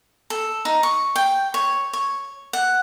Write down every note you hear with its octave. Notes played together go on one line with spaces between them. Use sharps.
A4
D#4
C#6
G5
C#5
C#5
F#5